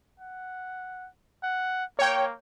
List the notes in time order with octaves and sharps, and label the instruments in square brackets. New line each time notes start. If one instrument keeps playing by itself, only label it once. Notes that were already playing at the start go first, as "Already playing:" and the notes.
[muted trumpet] F#5
F#5
[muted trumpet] A#3 [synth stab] C#5 G5